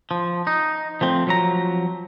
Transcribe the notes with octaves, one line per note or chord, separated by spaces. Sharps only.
F3
D#4
F3 A3 C4
F3 F#3 A#5